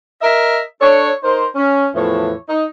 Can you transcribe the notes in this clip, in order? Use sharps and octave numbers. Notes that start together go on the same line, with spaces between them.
A#4 D#5 E5
D4 A4 C#5
D#4 A#4 C5
C#4
E2 A2 E3 F3 C#5
D#4